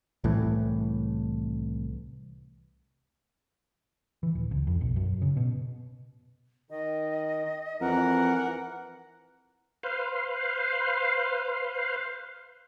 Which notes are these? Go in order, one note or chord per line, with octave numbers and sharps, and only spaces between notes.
C2 A2 E3
E3
D1
C#2
F2
B1
F#2
C#3
B2
D#3 D#5
F2 E3 A#4 F#5
B4 C5 F5